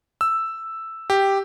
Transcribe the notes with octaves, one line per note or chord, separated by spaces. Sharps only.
E6
G4